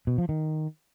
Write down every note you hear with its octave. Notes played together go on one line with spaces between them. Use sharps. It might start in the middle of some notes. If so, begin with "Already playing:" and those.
B2
F3
D#3